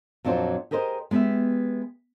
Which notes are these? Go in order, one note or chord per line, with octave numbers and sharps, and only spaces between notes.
F2 A#2 F#3 D4 C5
G4 G#4 A#4 C5 D#5
G#3 B3 G4 B4 E5